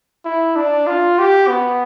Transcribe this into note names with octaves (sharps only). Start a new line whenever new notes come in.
E4
D4
F4
G4
B3